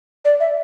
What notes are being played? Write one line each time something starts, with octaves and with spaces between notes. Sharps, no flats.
D5
E5